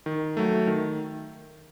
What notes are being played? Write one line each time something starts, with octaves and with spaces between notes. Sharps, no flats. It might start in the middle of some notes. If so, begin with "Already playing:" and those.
D#3
F#3 A3
D#3